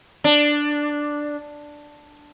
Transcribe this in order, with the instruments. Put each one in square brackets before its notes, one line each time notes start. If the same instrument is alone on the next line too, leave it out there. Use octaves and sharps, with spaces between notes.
[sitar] D4